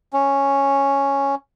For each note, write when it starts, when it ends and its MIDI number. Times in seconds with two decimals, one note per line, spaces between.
0.13 1.35 61